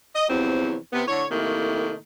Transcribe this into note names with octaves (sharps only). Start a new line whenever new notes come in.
D#5
E2 C3 F3 F#3 C4
C3 B3
A2 D3 C#5
A2 C3 D#3 A3 A#3